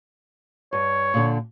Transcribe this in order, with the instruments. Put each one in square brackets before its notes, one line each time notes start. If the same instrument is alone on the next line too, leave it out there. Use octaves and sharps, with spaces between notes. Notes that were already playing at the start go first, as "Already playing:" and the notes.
[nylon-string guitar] G2 [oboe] C#5
[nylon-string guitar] A#2 D3